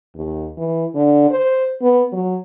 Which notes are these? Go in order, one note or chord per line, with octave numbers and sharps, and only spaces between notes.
D#2
E3
D3
C5
B3
F#3